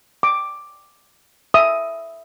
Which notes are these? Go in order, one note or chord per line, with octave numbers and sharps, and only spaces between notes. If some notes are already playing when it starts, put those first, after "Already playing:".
D6
E5 D#6